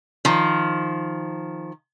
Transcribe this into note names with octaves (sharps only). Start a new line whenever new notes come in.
D#3 F3